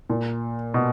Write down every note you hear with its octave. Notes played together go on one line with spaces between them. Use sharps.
A#2
B2